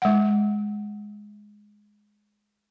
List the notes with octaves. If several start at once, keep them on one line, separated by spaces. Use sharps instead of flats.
G#3 F#5